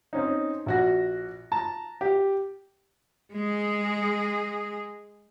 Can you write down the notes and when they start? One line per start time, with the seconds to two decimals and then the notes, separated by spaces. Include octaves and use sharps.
0.13 C4 C#4 D#4
0.66 A#1 F#4 A#6
1.52 A5 A#5
2.01 G4
3.33 G#3 G#4